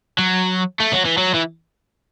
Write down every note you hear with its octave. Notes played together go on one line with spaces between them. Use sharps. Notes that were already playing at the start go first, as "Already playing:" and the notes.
F#3
A3
F#3
E3
F#3
E3